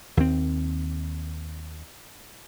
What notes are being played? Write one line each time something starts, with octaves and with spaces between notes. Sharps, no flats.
D#2 C4